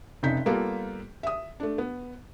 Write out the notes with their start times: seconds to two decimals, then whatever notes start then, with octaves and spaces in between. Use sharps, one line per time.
0.23 F1 C3 C#4 D#4 G6 B6
0.46 G3 A#3 B3 F4 A4
1.23 E5 D#6
1.60 A3 D4
1.78 B3